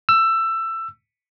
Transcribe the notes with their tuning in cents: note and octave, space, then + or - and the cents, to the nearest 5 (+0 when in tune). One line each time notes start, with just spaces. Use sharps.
E6 +15